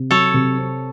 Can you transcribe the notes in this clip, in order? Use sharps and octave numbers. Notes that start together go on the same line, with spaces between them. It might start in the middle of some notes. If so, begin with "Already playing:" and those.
Already playing: C3
F#3 A4 C#5
C3
C4